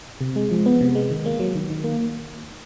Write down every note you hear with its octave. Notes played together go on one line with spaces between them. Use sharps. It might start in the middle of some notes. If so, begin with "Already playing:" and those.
C3
G#3
F3
B3
C3
G#3
D#3
A#3
F#3
D#3
D#3
A#3